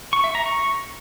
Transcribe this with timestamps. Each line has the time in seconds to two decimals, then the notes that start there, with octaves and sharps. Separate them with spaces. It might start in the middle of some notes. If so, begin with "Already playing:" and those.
0.13 C#6
0.24 E5
0.35 A#5
0.46 C#6